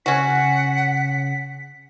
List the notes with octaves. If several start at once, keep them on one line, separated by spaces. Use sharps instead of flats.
C#3 C#4 F#4 F#5 B6